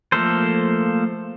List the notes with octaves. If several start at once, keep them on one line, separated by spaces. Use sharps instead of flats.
F3 A3 A#3 A4 C5